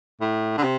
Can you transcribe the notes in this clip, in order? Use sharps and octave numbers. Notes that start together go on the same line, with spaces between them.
A2
D3
C3